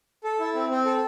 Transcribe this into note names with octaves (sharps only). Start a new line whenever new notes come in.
A4
E4
C4
C4
A4